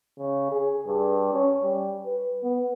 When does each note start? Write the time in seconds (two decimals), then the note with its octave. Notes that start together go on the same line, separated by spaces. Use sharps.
0.19 C#3
0.52 G#4
0.87 G2
1.33 C#4
1.63 G3
2.06 B4
2.43 B3